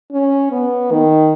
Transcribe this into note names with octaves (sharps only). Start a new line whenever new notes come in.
C#4
B3
D#3